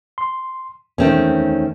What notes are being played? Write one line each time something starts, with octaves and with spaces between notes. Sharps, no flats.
C6
E2 D#3 A3 C4 C#4